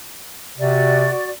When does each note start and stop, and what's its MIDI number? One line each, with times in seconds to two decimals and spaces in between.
0.58 1.10 48
0.58 1.29 66
0.58 1.29 74